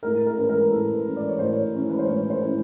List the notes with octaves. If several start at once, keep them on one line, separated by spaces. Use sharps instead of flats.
A2 A#4
A#4
E3 G#3 C#4 B4
A#4
A2 A4
B4
E3 G#3 C#4
D5
C#5
A2 C5
C#5
E3 G#3 C#4
B4
C5
A2 C#5
C5
E3 G#3 C#4